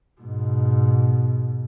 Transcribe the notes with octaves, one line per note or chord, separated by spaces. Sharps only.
G#2 B2